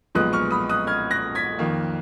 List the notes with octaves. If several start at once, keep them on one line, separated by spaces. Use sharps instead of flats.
B1 A#2 F3 G#3 B3 D#6 F#6
C#6 F6
B5 D#6
D#6 F#6
F6 G#6
F#6 A#6
G#6 B6
F2 D#3 A#3